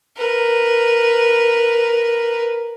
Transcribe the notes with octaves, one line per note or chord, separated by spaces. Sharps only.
A#4 B4